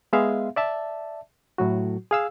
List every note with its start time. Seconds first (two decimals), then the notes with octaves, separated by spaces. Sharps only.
0.13 G#3 B3 G#4 E5 F5
0.56 D5 E5 A5
1.58 A2 F#3 F#4
2.11 G#4 F5 E6